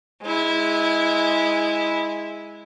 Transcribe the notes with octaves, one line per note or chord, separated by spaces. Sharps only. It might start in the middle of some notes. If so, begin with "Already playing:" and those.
G#3 E4